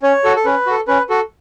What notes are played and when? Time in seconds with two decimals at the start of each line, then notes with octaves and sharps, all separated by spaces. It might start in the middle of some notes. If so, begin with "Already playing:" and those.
0.03 C#4 C#5
0.24 F#4 A4
0.36 A4
0.45 C#4 B4
0.67 F#4 A4
0.88 C#4 B4
1.10 F#4 A4